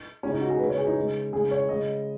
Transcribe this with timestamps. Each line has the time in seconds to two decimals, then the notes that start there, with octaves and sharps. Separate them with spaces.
0.23 G#3 C#4
0.27 C#3
0.32 D#4
0.41 F#4
0.50 G#4
0.59 C#3 G#3 B4
0.69 C#5
0.78 G#4
0.87 D#4
0.96 C#3 G#3
1.32 C#3 G#3 G#4
1.51 C#5
1.69 C#3 G#3 D#5